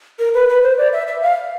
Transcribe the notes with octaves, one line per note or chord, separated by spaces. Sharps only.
A#4
B4
B4
C5
D5
E5
E5
F5